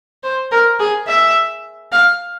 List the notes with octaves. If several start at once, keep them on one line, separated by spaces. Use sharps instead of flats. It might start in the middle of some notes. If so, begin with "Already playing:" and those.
C5
A#4
G#4
E5
F5